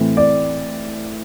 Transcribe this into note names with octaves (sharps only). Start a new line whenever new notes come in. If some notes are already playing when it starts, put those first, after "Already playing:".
Already playing: A2 E3 A3 C4
D5